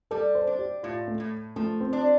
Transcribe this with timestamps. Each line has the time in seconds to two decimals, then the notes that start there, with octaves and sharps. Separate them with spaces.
0.11 G3 A4
0.35 C5
0.47 D4
0.59 G4
0.83 A2 F4
1.08 A3
1.20 A2
1.56 F3 A3
1.80 C4
1.93 D4